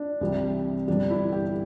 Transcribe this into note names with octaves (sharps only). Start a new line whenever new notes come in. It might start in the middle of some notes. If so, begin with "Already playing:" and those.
Already playing: D4
C2 C3 E3 G3
G1 G2 E3 G3 D4
E4
G4